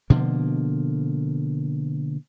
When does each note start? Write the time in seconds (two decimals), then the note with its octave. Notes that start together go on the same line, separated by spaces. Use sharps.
0.10 B2 D3 F3 A#3